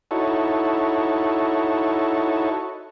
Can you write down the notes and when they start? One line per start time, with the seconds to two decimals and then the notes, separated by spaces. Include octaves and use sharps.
0.11 D#4 E4 F#4 A4 C#5